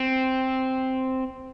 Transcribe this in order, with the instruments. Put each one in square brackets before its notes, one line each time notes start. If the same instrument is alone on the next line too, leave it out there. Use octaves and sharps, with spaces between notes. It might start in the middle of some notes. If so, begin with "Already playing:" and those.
Already playing: [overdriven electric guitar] C4